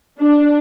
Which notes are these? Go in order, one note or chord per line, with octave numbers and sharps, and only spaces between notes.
D4